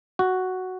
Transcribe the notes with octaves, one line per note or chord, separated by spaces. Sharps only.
F#4